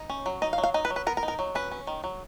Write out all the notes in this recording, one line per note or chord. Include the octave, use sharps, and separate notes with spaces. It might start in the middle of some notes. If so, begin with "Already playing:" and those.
Already playing: D#4
C#4
F#3
D#4 D#5
F5
F#3
F5
D#4 D#5
B4
F#3
B4
B3 A#4
A#4
D#4
A#4
F#3
C#4 B4
C#4
D#3
F#3